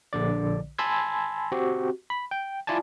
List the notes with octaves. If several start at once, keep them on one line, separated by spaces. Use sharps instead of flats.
A#1 D3 D5
G#5 A5 B5 C6 E6 G#6
C4 F#4 G4
B5
G5
E4 F4 D5 G#5 A5